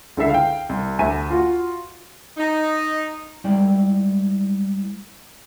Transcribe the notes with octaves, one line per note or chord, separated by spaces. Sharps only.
C#2 D3 E4 A4 E5 C7
F5 G5
C2
D2 E5 G#5 A#5 D#7
F4 F#4
D#4
G3 G#3 E4 D5 G5